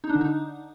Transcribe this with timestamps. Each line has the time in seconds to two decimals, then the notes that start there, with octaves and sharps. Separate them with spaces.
0.04 D#4
0.09 D4
0.15 D3
0.21 D#4